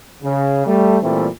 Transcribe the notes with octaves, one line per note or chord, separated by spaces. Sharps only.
C#3
G3 A3
A#2 E3 G3 A3 C4